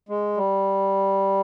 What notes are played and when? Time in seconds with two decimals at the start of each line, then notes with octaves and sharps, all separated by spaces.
0.09 G#3
0.37 G3